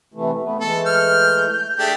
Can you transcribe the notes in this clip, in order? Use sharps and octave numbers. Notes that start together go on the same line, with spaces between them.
C3 E3 A3
A3 B3
E3 G#3 A3 A4
F6 G6
A3 D4 G4 G#4